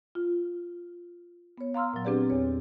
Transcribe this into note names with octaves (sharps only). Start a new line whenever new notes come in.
F4
B3 C#5
F5 A#5 C6 E6 F6
A#2 F#3
C4 D4 G4 G#4 B4 D5
E2 C#5